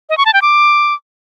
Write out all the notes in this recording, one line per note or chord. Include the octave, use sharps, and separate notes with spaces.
D#5
C#6
A5
G5
D6